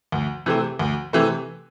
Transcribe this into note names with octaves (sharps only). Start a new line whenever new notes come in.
D2
C3 E3 A3 C4
D2
C3 E3 A3 C4